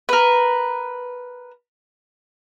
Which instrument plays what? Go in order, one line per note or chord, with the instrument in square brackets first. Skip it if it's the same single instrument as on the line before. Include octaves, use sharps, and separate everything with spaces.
[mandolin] A#4 B4